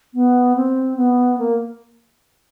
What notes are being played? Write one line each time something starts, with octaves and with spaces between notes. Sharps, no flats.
B3
C4
B3
A#3